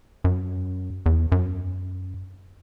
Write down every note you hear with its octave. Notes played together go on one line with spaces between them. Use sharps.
F#2
E2
F#2